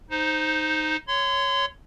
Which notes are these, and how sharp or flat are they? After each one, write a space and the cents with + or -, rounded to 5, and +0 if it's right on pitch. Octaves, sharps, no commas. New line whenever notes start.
D#4 +0 C5 +0
C#5 +0 C6 -30